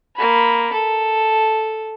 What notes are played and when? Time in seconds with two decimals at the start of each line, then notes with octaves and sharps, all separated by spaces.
0.16 A#3 B5
0.73 A4